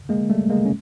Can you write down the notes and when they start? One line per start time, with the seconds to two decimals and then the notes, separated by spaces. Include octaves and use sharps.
0.09 G#3 A#3
0.30 G3 A3
0.50 G#3 A#3
0.65 C#4